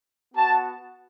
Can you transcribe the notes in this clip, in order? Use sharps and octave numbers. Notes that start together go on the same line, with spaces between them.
B3 F#4 A5